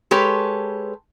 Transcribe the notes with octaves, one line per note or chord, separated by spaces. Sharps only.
G#3 G4 A4 B4 C#5